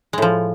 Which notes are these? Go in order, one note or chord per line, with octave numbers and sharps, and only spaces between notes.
A2 F3 G#3